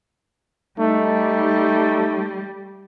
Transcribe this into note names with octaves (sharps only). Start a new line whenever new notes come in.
G3 A3 D#4